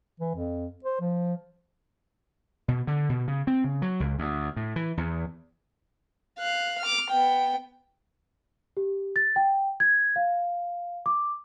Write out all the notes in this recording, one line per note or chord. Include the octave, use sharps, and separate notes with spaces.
E3
F2
C5
F3
B2
D3
B2
C#3
C4
C#3
F#3
C#2
D2
A2
E3
E2
F5 F#6
D6 F6
B3 G5
G4
A6
G5
G#6
F5
D6